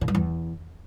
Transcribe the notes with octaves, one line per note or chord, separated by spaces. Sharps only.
C#3
G2
E2